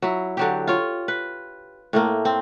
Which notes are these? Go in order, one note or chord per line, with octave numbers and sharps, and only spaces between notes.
F#3 E4
D3 F#3 G4
F4 C#5
B4
A2 A3 A#3
C4